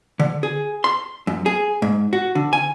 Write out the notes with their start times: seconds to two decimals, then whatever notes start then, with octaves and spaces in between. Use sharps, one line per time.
0.19 D3
0.43 G#4
0.84 C6
1.27 F#2
1.46 G#4
1.82 G#2
2.13 F#4
2.35 D3
2.53 G#5